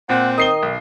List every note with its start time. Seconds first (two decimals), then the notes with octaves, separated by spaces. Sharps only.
0.09 A#2 C4 F#5
0.38 D#3 D#5 D#6 C7 G7
0.63 B1